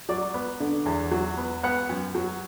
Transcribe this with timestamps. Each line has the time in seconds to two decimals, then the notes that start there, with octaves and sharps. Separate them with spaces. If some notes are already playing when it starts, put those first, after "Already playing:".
0.09 F#3 D5
0.34 B3
0.60 D3
0.86 E2
1.11 F#3
1.37 B3
1.63 B3 F#5
1.89 F#2
2.15 F#3